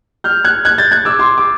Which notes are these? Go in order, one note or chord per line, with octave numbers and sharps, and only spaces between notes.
F6 G6
F#6 G#6
F#6 G#6
G6 A6
F#6 G#6
D6 E6
C6 D6
D6